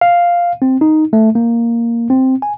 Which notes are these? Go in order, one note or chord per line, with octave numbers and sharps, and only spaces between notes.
F5
C4
D#4
A3
A#3
C4
G#5